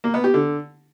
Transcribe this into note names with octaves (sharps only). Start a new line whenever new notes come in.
A#3
B3
G4
D3